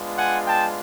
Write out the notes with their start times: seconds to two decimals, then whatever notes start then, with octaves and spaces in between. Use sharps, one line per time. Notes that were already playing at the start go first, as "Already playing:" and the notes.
Already playing: G#3 B3 D4 F4
0.17 F#5 G#5
0.46 G5 A5